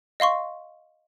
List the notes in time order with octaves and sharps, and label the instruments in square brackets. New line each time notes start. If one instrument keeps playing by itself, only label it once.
[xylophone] D#5 F5 C6 C#6